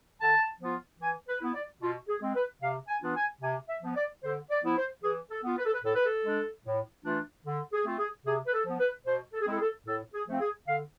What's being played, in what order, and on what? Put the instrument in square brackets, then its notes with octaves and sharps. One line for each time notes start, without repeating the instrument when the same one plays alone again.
[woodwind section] D3 A5
F3 B3 F4
E3 G#5
B4
B3 E4
D5
B2 F4
G#4
G#3 C4
B4
C3 F5
G#5
E3 B3 D4 F4
G#5
C3 G#5
E5
F3 B3
D5
D3 C5
D5
F3 B3 E4
C5
E3 G#4
A4
B3 F4
B4
A4
B4
A2 A4
B4
A4
G#3 D4
A2
E3 A3 D4 F4
D3
G#4
A3 C4 F4
G#4
C3 G#4
B4
A4
F3 B3
B4
B2 C5
A4
G#4
G#3 C4 E4 A4
G#4
A4
A2 A4
G#4
F3 A3 C4 F4
G#4
D3 F5